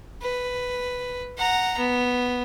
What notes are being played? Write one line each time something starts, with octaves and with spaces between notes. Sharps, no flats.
B4
F#5 A#5
B3